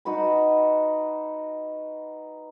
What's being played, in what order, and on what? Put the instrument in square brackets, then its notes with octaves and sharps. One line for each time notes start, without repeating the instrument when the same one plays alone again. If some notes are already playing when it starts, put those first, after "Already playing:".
[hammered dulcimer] D#4 F#4 B4 B5